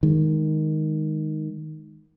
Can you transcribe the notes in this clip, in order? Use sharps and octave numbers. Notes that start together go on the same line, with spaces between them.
D#3 G#3